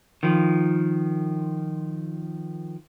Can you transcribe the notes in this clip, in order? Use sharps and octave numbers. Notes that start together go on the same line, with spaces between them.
D#3 F3